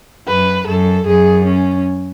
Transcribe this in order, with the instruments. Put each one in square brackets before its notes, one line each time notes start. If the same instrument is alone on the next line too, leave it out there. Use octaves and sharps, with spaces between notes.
[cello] F#2 [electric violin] B4
[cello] F#2 [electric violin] A4
[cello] F#2 [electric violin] G#4
[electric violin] C#4